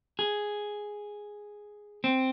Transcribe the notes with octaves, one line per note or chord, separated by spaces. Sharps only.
G#4
C4